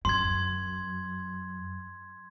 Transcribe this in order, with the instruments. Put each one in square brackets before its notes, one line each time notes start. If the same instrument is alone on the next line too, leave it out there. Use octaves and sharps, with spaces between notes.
[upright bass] F#2 [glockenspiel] C6 G#6